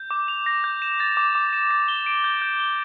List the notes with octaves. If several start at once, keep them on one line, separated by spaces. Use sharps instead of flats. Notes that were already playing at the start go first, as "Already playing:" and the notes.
Already playing: G6
D6
F7
A#6
G6
E7
A6
D6
D6
E7
A6
G7
D7
G6
G6
G7